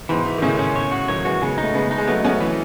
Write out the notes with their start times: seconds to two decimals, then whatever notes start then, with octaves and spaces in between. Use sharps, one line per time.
0.09 G#2 B2 E3
0.26 E3
0.38 D#3
0.42 A2 C#3 C#4
0.59 C#4
0.76 C#5
0.92 F#4
1.08 D#3 F#3 C#5
1.24 E3 G#3 F#4
1.42 C#3 G#3 B3
1.58 D#4
1.63 A3
1.74 C#3 G#3 B3
1.91 D#4
1.98 G#3
2.08 F#3 A3 B3
2.24 A3 B3 C#4
2.41 E3